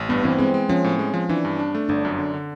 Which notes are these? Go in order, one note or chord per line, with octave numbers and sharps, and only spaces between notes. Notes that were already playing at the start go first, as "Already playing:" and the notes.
Already playing: A1
G2 B3
E3 C4
G#3 C4
G#3
F3 C#4
A2
G#3
F3
E3 D4
G2
D4
A3
G1 D4
F#2
D3
D3